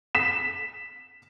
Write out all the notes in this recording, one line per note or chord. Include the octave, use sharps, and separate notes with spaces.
B6 E7